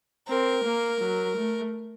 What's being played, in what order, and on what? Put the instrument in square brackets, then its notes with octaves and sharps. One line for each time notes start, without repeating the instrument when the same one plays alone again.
[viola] C4 [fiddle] A#4
[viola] A#3
F#3
A3